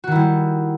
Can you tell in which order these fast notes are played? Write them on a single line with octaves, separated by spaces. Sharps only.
F#4 D#3 E4 G3